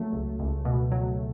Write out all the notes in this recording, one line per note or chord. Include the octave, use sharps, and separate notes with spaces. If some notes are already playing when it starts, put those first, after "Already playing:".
Already playing: F#3 A3
C#2
C#2
B2
F#3